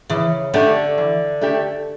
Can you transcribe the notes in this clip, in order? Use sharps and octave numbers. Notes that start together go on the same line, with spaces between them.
C#3 E3
D3 A3 D4 G4
E3
A3 D4 G4